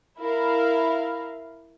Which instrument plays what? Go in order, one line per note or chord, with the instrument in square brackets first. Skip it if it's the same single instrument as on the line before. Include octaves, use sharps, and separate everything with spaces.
[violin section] E4 A#4 F5